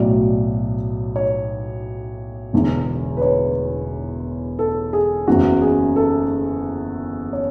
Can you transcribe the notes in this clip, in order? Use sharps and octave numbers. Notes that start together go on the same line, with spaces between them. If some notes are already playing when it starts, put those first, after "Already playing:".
Already playing: B1 A2 F#3 D5
C#5
E1 E2 D3
B4
C#5
A4
G#4
F#1 E2 C#3 F#4
G#4
A4
C#5